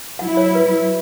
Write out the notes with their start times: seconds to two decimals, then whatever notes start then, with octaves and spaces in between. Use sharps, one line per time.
0.19 F#3 E4 F#5
0.37 C#5
0.55 B4